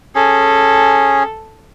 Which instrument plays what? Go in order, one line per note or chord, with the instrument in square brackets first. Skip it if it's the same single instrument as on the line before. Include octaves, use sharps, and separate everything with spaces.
[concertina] C#4 G#4 [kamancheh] A4